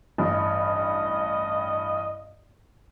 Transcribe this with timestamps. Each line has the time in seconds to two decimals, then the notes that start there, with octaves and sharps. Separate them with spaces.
0.18 A1 G2 D#5